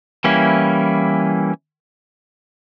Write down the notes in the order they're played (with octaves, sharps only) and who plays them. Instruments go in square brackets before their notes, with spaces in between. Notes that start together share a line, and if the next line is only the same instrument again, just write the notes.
[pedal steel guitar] E3 G3 A#3 C#4 E4